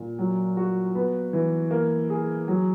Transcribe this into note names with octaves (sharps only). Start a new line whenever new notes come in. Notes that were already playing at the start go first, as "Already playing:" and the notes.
Already playing: A#2
F#3
F#4
B3
E3
A#3
G#4
F#3